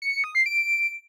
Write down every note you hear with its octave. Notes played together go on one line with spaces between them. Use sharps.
C#7
C#7
D#6
C7
D7